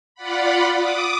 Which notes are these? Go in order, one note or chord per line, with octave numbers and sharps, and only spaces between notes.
F4 D5 F#5 B5
D6 D#6